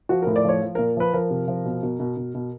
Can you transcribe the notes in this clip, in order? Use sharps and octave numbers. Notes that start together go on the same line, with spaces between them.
F3 F#4
A2 A#4
D5
F3 C#5
F3
A#2 A#4
F3 B4
F3 A#4
C3
F3
B2
B2
B2
B2
B2